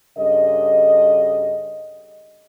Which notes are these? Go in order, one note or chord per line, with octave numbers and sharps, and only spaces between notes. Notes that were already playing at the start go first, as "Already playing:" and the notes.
G2 C#3 A4 D#5